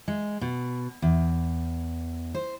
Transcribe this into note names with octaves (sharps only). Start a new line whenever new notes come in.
G#3
B2
E2
C5